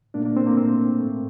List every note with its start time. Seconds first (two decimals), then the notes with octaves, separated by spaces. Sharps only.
0.14 A#2 A3 A#3 D4
0.25 A#3 D4
0.37 C4
0.47 A#3
0.57 A#2 A3 C4
1.00 A2 A3